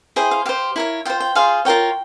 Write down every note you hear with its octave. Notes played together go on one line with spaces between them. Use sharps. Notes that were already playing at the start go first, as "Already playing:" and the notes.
E4 G#4 C5 G5
F5
G4 C5 F5
E4 A#4 C#5
F4 C5 G5
G5
F4 G#4 C5 F5
F4 A#4 C#5 G5